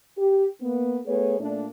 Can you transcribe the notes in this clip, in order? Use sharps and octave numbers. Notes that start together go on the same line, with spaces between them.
G4
A#3 B3
A3 B3 G#4 B4 C#5
A#2 A3 D4